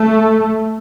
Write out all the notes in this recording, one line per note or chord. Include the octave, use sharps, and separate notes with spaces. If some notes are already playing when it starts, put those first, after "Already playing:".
Already playing: A3